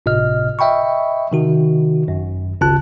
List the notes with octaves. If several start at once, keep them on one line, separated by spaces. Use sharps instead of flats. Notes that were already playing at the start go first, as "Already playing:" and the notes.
G1 A2 C3 D#5 F6
D#5 E5 G5 B5 C#6
C3 D#3 F#4
G#1 F#2
G#1 D2 C#3 F4 A5 F#6